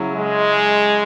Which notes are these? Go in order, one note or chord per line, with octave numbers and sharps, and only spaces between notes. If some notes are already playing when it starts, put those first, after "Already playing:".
Already playing: C#3 F#3 C#4 E4
G#3